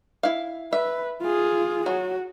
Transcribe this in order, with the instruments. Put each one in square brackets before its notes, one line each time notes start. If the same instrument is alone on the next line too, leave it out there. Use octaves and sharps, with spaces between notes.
[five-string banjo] E4 F5
[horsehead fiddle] B4 [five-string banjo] E5
[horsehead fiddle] F4 G#4
[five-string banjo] F#3 [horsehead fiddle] F#4